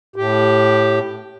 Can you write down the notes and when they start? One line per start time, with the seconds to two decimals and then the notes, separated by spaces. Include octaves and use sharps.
0.16 A2 G4